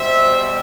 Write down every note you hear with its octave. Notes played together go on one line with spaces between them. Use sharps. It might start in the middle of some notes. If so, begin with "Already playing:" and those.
Already playing: B2 G3 C5 E5